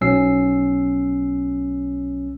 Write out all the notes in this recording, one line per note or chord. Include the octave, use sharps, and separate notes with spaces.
B1 F#3 C#4 E6 C7